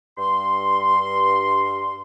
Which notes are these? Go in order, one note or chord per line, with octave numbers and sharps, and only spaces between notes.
G2 C6